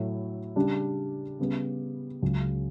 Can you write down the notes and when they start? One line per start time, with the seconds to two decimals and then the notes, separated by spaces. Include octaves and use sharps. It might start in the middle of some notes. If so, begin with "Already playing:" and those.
Already playing: A2 F#3 A3 E4
0.56 C#3 G3 D4
1.39 C#3 G3 B3
2.22 C#2 C#3 F#3 C#4